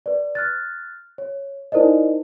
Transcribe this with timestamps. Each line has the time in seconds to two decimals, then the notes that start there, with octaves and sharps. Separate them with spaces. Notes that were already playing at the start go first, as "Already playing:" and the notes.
0.06 B4 D5
0.35 F6 F#6 A6
1.18 C#5
1.72 D#4 E4 A#4 C5 D5 D#5